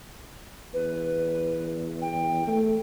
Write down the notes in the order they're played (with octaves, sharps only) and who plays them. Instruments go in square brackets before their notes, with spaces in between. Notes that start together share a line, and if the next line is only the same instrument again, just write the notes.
[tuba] E2 [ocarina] B4
[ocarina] G5
[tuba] A3